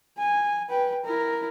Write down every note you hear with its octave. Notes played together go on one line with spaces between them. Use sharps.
G#5
B4 G5
E4 A#4